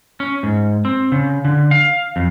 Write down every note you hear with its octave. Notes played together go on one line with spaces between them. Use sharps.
C#4
G#2
C4
C#3
D3
F5
F2